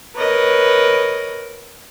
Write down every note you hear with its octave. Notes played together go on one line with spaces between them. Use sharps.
A#4 B4 C#5 D#5